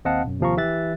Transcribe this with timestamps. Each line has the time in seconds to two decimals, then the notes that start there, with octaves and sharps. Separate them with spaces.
0.05 D#2 C4 D#5 F5 F#5 A5
0.24 F#2 B2
0.40 D#2 C3 F3 F5 A#5 C#6
0.57 E3 G4 E5 F#6 A6